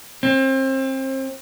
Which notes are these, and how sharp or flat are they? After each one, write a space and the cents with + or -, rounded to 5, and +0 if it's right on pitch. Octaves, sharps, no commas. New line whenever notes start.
C4 +30